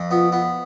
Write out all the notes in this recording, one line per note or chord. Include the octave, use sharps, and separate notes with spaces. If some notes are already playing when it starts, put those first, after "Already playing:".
Already playing: F2
B3 F4
B3